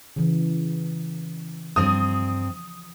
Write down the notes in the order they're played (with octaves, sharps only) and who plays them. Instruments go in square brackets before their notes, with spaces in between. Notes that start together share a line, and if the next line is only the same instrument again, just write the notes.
[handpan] C#3 E3
[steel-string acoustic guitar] G2 C4 [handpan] F3 [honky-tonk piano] D#6